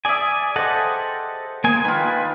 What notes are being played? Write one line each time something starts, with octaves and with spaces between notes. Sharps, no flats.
G#4 D5 E5 G#5
G4 A4 C5 D#5 F#5
G#3 A#3 G#5
D#3 F4 B4